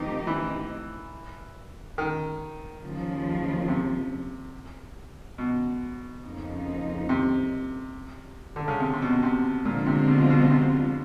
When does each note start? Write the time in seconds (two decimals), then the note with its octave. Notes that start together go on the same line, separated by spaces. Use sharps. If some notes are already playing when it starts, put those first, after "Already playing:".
Already playing: D#3 F3 A3 C4 D#4 G4
0.27 E3
1.98 D#3
2.82 D#2 C#3 F3
3.68 C3
5.38 B2
6.24 F2 C#3 F3 A#3 D#4
7.09 C3
8.56 D3
8.68 C#3
8.80 C3
8.93 C3
9.02 B2
9.23 C3
9.65 A#2 D3 F3 G#3 C4 F4
9.87 C3
10.08 B2
10.30 B2
10.50 C3